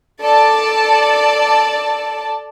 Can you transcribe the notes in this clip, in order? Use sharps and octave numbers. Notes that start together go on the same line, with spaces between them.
A4 D5 A5